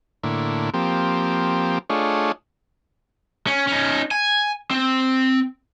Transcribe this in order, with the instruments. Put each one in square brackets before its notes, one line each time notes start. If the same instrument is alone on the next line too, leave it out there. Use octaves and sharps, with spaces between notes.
[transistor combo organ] A2 D3 A#3 E4
F3 A#3 C4 G4
A3 D4 F4 G#4 C#5 D#5
[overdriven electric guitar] C#4
C#4 D#4
G#5
C4